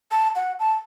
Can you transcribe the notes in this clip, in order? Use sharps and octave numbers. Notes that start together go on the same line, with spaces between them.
A5
F#5
A5